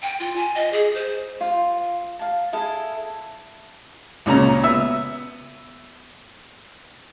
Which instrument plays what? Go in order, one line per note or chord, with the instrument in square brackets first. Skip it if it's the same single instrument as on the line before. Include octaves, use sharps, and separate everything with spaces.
[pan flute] G5
F4
G#5
D#5
G#4
C5
[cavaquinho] F4
F5 A5
E4 G#4 A4
[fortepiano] C#2 A#2 C#3 A#5
B3 E5 E6